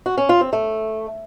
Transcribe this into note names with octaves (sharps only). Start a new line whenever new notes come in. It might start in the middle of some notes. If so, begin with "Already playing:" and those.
F#4
C#4
F4
C4
A3